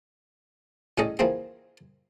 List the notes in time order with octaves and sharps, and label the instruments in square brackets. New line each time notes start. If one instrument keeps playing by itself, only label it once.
[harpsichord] A2 G3 C#4 G#4 A4 D#5
E3 F3 A#3 C4 G#4